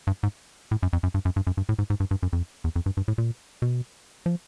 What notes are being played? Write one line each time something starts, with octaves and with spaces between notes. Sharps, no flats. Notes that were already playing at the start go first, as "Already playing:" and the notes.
G2
G#2
A2
F#2
F2
F#2
G2
F#2
G2
F#2
G2
A2
G#2
G#2
G2
G2
F#2
F2
E2
F2
G2
G2
A2
A#2
B2
F3